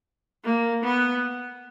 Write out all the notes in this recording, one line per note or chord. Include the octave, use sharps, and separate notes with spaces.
A#3
B3